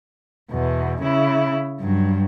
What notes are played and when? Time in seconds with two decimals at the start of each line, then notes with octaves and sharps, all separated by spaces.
0.51 E2 B2
1.01 C#3 E4
1.81 G2 F#3